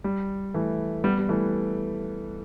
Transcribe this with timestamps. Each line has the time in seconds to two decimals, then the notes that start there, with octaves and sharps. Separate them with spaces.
0.04 G3
0.54 E3 A3
1.04 G3 B3
1.19 G3
1.29 E3 A3